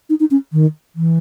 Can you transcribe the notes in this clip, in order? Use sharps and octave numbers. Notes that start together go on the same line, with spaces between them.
D#4
D#4
C#4
D#3
E3